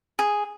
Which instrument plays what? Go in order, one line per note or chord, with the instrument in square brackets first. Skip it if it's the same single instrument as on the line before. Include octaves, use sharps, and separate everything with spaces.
[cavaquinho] G#4